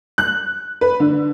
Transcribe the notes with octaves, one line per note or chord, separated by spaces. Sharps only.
F#6
B4
D3